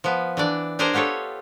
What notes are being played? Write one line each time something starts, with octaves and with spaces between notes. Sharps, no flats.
F3 B3
E3 D4 D5
D4 G4 G#4 A#4 C5 D#5
B3 F4 G4 A4 C#5